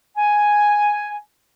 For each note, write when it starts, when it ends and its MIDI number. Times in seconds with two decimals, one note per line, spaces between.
0.17 1.17 80